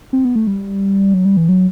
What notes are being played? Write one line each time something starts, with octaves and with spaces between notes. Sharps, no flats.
C4
B3
A3
G3
F#3
G3
E3
F#3